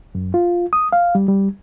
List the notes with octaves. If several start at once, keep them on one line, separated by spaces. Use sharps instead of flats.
F#2
F4
D#6
F5
G3
G3